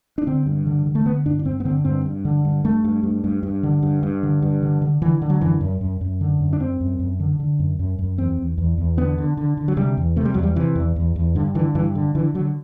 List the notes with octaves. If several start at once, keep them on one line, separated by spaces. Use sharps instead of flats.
D4
D3 C4
G2
D3
D3
A3
D3 B3
G2 D4
D4
G2 C4
B3
D3 C4
G2 C4
G2
D3
G2
G2 A3
G2
G2
G2
G2
D3
G2
G2
D3
G2
D3
D3
D3 E3
D3
F#3
F#2 E3
F#2
F#2
F#2
D3
F#2
D4
F#2 C4
F#2
F#2
D3
D3
F#2
F#2
F#2
E2 C4
E2
E2
E2
D3 B3
D3
D3
D3
F#3
C3 G3
E2
C3 A3
G3
E2 F#3
G3
C3 E3
E2
E2
E2
G2 D3
D3 E3
G2 E3
D3
D3 E3
D3 F#3